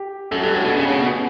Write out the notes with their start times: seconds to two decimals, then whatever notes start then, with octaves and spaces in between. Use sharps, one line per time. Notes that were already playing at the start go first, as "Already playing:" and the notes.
Already playing: G4
0.31 F#2 A4
0.43 G2 G4
0.54 A2 F#4
0.65 B2 D4
0.77 C#3 C#4
0.88 C#3 A3
0.99 B2 B3